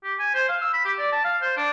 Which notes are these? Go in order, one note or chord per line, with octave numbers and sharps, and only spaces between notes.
G4
G#5
C5
F5
E6
B5
G4
D5
A5
F5
C5
D4